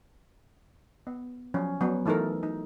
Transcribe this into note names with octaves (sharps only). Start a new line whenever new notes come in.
B3
F3 F#3 C#4
F#3 B3
E3 A3 D#4 A4 A#4
D#4